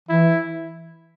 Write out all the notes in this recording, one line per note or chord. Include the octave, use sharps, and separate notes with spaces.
E3 E4